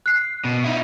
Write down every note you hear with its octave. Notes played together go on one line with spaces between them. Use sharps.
F#6 C7
B2
D#4 E4